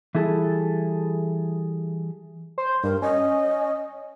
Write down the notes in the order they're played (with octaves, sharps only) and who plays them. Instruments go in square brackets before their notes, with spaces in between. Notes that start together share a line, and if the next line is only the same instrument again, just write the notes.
[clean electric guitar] E3 G3 E4 G#4 A4
[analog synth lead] C5
[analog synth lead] G2 [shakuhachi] A#4
[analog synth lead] C#4 [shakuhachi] D#5